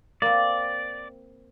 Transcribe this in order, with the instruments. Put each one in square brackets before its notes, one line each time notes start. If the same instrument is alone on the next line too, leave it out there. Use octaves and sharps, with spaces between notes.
[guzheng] A#3 C4 [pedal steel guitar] D5